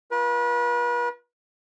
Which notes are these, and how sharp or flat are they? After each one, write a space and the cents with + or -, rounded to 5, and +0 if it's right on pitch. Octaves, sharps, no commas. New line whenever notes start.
F4 +0 B4 -40